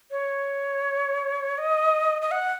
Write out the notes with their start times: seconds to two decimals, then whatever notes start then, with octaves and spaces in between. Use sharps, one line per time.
0.11 C#5
1.58 D#5
2.22 D#5
2.31 F#5